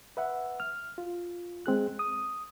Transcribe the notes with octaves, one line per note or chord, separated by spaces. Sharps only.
B4 E5 F#5
F6
F4
G#3 C4 G#4 F#6
D#6